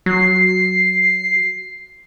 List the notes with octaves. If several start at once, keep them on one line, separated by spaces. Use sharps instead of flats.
F#3 C7